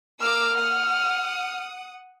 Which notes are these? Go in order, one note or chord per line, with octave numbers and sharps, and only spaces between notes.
A#3 D6 E6 F6
F#5 D#6